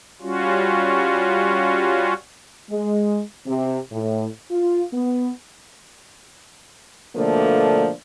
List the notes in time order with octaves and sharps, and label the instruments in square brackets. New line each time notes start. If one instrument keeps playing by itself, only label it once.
[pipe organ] G3 C#4 F4 F#4
[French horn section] G#3
C3
A2
F4
B3
B2 D3 F3 A3 A#3 D4